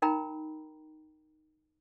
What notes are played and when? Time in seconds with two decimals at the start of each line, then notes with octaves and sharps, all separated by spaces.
0.02 D#4 A#4 G5 A#5 B5